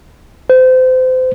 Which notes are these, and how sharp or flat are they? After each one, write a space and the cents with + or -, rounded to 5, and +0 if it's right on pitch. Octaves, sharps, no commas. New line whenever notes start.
C5 -30